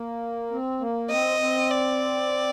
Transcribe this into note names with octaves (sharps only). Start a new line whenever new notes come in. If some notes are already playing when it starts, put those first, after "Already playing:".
Already playing: A#3
C4
A#3
C4 D#5
C4
D5